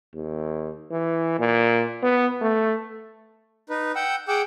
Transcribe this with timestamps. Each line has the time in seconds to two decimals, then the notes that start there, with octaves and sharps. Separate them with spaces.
0.14 D#2
0.91 E3
1.39 A#2
2.03 B3
2.42 A3
3.69 D#4 B4
3.96 F#5 G5 E6
4.28 G#4 F#5 G5 D6 E6